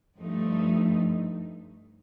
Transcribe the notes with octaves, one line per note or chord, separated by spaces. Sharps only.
G2 F3 A3 D#4